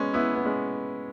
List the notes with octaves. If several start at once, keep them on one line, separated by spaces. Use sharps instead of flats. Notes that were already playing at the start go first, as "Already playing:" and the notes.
Already playing: G#3 B3 C#4
B3 E4
B3
G#3 C#4